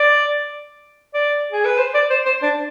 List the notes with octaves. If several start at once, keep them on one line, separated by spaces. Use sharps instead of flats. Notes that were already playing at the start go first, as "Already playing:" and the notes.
Already playing: D5
D5
G#4
B4
C5
D5
C5
C5
D4